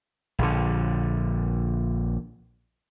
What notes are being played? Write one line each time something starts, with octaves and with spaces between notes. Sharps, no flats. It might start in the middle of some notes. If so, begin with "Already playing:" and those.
A#1 D3